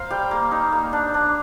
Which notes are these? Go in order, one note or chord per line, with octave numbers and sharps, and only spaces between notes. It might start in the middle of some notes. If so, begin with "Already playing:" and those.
Already playing: A#4 C5 F5
G3 G5
A#3
D#4
A#3
D4
D4